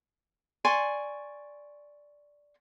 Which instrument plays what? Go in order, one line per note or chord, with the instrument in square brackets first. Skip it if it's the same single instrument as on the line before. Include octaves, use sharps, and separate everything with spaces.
[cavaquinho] D5 G#5 C6 C#6